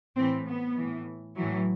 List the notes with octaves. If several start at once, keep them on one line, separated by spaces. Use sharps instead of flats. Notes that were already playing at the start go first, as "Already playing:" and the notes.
A2 E3 C4
B3
A2 E3
A2 E3 F#3